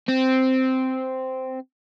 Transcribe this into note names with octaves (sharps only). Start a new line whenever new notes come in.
C4